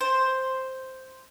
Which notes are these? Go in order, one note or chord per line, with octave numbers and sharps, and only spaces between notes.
C5